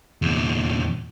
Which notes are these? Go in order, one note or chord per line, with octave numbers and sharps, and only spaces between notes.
E2 A#2